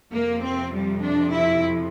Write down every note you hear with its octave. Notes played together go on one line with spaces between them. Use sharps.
F2 C3 F3 A#3
C4
G3
D4
E4